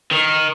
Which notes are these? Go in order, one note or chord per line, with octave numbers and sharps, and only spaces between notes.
D#3